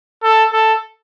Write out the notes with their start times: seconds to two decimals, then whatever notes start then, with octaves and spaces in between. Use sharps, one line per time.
0.23 A4
0.52 A4